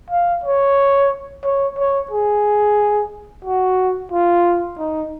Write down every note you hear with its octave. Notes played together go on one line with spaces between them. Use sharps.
F5
C#5
C#5
C#5
G#4
F#4
F4
D#4